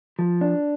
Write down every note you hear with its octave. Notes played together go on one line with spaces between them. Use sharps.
F3
D4